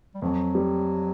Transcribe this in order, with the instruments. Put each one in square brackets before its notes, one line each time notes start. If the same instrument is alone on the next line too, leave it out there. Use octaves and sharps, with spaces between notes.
[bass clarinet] G3
[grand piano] F2 [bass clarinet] F#3
[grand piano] G3